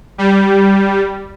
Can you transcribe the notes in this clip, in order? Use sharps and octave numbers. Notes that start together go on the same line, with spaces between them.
G3